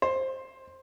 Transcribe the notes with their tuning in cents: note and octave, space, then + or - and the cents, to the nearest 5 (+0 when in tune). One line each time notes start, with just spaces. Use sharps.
C5 +15